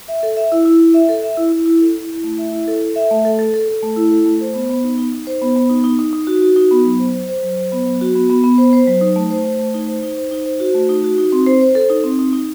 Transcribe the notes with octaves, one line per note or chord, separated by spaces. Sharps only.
E5
A4
E5
E4
E4
E4
E5
A4
E5
E4
E4
E4
A4
E4
E4
A3
E5
E4
A4
A4
E5
A3
A4
A4
A4
A4
A3
E4
A4
A3
C5
B3
B3
D#4
D#4
D#4
C5
B3
B3
D#4
D#4
D#4
D#4
F#4
F#4
D#4
B3
F#3
C5
C5
C5
F#3
C5
B3
F#3
F#4
B3
B3
B3
C5
C5
F#3
D#4
A3
C5
A3
A3
D#4
C5
D#4
C5
D#4
C5
F#4
A3
D#4
F#4
D#4
C4
C5
C5
A4
D#4
C4
D#4
D#4